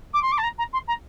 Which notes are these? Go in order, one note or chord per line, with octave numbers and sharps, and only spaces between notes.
D6
C6
D6
A5
A#5
A#5
C6
A#5